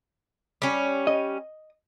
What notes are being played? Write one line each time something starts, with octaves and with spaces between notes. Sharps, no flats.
G3 C#4
D#5